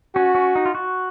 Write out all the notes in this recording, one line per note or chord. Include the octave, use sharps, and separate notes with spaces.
C#4 F#4
C#4
D#4
F4
F#4